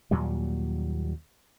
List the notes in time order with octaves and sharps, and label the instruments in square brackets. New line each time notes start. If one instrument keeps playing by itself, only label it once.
[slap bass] D#2 A#2 F#3 G3